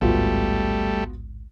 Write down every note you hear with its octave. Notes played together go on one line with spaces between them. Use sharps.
A1 D2 G#2 G3 A3 B3 F4 F#4